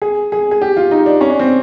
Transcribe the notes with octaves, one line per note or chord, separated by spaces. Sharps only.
G#4
G#4
G#4
G4
F4
D#4
D4
C#4
D4
C4